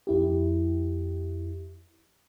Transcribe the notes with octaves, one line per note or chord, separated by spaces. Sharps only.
F2 E4 G4